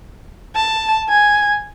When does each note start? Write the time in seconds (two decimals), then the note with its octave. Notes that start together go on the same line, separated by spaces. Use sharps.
0.56 A5
1.09 G#5